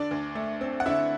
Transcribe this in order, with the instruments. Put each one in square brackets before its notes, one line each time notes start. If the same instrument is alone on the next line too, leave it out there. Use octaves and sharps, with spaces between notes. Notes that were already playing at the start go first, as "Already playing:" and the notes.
Already playing: [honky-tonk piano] D3 D4 D5
D2
A3
C4
F#5
D3 E4 E5